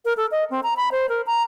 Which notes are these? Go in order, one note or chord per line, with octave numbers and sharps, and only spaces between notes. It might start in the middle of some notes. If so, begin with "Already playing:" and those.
A#4
A4
D#5
C4
A#5
B5
C5
A#4
A#5